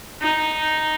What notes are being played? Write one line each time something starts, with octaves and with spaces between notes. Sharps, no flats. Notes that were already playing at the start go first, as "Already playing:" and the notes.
D#4